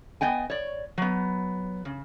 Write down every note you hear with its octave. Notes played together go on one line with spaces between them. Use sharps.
B3 D#5 G5 G#5
C#5 D5
F#3 B3
C#3